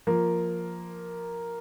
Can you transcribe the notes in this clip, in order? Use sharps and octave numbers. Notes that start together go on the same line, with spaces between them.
F3 A#3